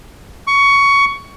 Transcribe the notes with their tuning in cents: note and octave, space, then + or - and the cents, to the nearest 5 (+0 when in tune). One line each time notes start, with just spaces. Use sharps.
C#6 +15